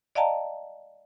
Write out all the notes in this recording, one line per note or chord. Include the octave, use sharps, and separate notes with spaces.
D5 D#5 F5 G5 A5 A#5